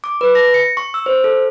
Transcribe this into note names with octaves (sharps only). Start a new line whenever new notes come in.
D6
B4
A#6
C#7
C#6
E6
C5
A4